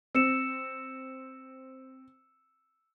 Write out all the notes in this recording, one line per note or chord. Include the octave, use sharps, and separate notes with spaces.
C4 E6 C#7 E7